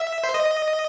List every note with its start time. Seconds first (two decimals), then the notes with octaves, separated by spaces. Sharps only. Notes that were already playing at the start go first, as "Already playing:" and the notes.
Already playing: E5
0.23 C5
0.34 D#5